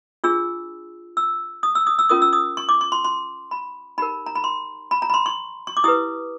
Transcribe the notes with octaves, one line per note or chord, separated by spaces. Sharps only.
D4 F4 G#4 E6
E6
D#6
E6
D#6
E6
C#4 F4 A#4 D#6
E6
D#6
C#6
D6
C#6
C6
C6
B5
D#4 G4 A#4 B5
A#5
B5
C6
B5
A#5
B5
C6
C#6
C#6
D6
E4 G4 B4 D#6